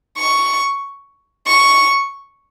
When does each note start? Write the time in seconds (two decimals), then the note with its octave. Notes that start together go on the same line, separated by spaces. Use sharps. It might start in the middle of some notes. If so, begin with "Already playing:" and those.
0.18 C#6
1.47 C#6